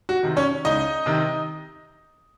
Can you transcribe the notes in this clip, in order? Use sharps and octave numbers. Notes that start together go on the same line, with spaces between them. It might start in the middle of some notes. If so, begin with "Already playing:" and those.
F#4
C3 D#3
C#4 C#5
C#2 D#4 D#5
C3 D#3